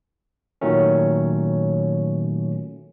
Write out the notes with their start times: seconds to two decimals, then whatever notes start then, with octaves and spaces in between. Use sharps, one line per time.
0.61 A#2 D#3 F#3 A3 C#4